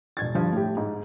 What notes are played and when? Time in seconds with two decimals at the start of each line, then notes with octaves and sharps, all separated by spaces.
0.17 E1 G#6 A6
0.35 G2 F3
0.53 A2 G4
0.77 G#2